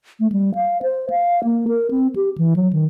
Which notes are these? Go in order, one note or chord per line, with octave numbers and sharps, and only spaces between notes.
A3
G3
F5
C5
F5
A#3
A#4
C4
G4
E3
F#3
D#3